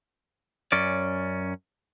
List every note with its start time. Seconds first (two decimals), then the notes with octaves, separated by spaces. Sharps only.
0.72 F#2 C#4 D5